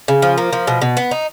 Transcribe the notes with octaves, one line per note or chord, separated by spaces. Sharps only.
C#3
F3
A#3
F3
B2
B2
B3
D#4